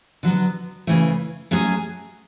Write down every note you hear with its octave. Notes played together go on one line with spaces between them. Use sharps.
D3 F#3 B3
C#3 E3 A3
F#3 A3 C#4 G#4